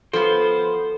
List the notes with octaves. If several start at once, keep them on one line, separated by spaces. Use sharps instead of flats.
F3 B3 A4 C5